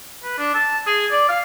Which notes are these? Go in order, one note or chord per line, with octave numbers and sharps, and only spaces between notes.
B4
D4
A5
G#4
D5
F5